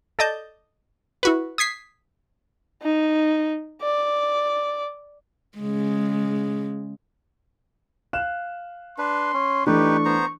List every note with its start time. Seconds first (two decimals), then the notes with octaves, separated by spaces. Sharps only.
0.19 A4 D5 D#5 A5 G6
1.23 E4 F#4 B4
1.58 D#6 G#6 B6 C7
2.82 D#4
3.82 D5
5.58 C#3 G#3
8.13 F5 F#6 E7
8.98 D4 B4 C6
9.34 C#4
9.67 E3 A3 D4 D#4 G4 B4 C#6
10.05 B3 C5 A#5